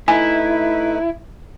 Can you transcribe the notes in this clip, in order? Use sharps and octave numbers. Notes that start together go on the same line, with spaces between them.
A3 D#4 E4 B4 G#5